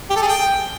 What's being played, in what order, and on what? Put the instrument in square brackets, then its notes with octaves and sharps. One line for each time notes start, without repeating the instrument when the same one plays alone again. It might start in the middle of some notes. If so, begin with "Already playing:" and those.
[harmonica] G4
A4
G#4
G5